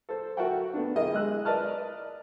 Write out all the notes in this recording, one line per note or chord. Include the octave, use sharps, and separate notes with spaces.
A4 C5
F#4 A4 A#4 E5 F#5 G5
A3 B3 D4
E4 G4 G#4 A#4 D#5
G#3 E6 F#6
A#4 B4 D5 D#5 A5 F6